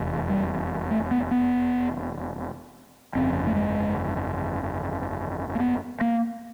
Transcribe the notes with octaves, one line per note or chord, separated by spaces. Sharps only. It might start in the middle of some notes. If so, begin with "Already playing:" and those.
Already playing: F1 E2 C3
G3
A3
B3
B3
G1 F2 C#3 C4
A3
G#3
A#3
B3
A#3